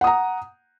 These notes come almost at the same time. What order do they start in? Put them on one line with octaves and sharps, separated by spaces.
F#5 D#6 A#5